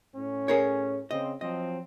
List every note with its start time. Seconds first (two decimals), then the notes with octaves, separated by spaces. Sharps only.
0.15 A2 C#4
0.48 G#4 A#4 C#5
1.11 C#3 C4 D#5
1.41 F3 F#3 C4 D#5